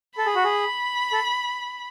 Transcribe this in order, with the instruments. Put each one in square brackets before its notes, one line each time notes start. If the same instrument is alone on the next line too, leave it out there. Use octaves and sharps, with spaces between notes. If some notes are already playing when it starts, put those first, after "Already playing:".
[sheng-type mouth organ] A4 [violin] B5
[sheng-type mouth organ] G#4
F#4
G#4
A4